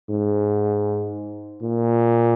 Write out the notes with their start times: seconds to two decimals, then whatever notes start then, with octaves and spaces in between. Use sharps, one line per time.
0.10 G#2
1.63 A#2